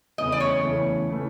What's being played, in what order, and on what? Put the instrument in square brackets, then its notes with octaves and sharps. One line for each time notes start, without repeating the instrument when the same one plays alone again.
[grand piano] E2 C#3 E3 A3 [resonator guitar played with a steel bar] D#5
[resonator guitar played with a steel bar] D5
C#5
[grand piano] E2 C#3 E3 A3
C#3 E3 A3